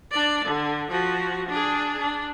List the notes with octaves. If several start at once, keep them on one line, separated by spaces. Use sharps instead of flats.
D4 D5
D3
F3 F#4
D4 G#4
D4